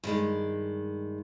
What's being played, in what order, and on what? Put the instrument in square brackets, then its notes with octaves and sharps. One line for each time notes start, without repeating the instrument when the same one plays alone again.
[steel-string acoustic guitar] G2 D#3 G#3